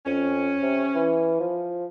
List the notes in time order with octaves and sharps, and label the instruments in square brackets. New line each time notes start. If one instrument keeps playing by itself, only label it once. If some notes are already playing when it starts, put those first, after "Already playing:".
[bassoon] F2 [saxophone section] C#4
[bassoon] C3
E3
F3